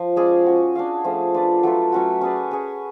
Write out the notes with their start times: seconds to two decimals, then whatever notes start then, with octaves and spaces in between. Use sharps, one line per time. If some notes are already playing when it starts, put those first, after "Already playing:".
Already playing: F3
0.16 G#3 C#4 G#4 D5
0.46 C#4 F#4 C#5
0.75 D4 F#4 C#5 F5
1.04 F3 A3 C#4 G#4
1.34 D4 F4 B4 D5
1.63 F#3 A3 F4 B4
1.92 F#3 A3 C#4 F#4
2.21 C#4 G#4 B4 D5
2.51 C#4 G#4 C#5